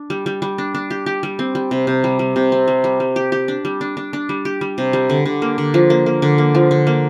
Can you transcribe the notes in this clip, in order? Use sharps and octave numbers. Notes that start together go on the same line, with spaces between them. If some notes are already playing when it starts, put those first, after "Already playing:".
Already playing: D4
G3
G3
G3
D4
D4
G4
G4
G3
C4
G3
C3
C3
G3
G3
C3
C4
G3
G3
G3
G4
G4
D4
G3
D4
D4
D4
G3
G4
G3
C3
G3
D3
D3
A#3
D3
F3
A#3
A#3
D3
A#3
F3
D3
A#3